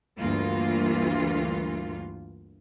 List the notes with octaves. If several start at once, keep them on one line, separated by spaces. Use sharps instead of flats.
D2 G2 E3 A#3 F4